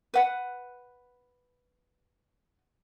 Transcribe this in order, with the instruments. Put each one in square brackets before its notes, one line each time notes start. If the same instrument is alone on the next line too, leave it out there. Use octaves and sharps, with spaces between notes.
[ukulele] B4 F#5